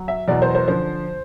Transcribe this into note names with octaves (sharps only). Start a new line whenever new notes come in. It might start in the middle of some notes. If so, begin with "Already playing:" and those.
Already playing: F#3
E5
E2 B2 F#3 D5
C5
C5
D3 F3 C5